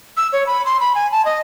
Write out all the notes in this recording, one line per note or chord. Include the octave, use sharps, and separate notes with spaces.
E6
C#5
B5
C6
B5
G#5
A5
D#5